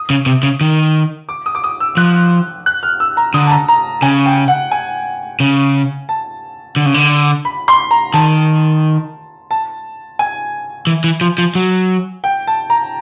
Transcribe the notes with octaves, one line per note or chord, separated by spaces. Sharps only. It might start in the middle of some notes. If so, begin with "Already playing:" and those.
Already playing: D#6
C#3
C3
C#3
D#3
D6
D#6
D6
D#6
E6
F3 F#6
F#6
F6
E6
A#5
D3 D#6
A5
A#5
A#5
C#3 G#5
G5
F#5
G#5
C#3
A5
D3
C#3
D3
B5
C6
A#5
D#3 A5
A5
G#5
E3
E3
F3
F3
F#3
G5
A5
A#5